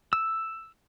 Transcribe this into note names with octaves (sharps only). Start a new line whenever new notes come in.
E6